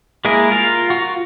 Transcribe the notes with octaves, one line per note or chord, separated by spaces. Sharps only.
G#3 A#3 E4 G#4 A#4
F4 A#4 F5
F4 F#4